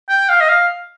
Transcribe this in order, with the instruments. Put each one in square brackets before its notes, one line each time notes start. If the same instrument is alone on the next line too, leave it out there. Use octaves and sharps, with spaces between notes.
[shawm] G5
F5
D#5
F5